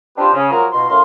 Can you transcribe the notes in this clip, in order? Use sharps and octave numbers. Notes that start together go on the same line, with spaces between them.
C4 D4 F4 G4 B4 C5
C#3
F3 F#3 G#3 F#4 A#4
B2 D#4 F4 C6
F#2 A2 F5 C6